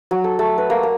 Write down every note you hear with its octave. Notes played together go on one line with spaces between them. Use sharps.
F#3
A4
A3
B4
A#3
A#3